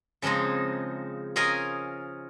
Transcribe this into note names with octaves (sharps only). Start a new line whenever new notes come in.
C#3 F3 G#3 C4 D#4
C#4 F4 G#4 A#4 D#5 G#5